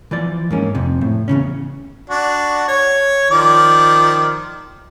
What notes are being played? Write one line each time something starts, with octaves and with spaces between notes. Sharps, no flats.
E3 F3 D5
G#2 A#3 C#4
F2 C3
A2
E2 G#2 C#3 C#4
D4 F#4
C#5
D#3 F3 D5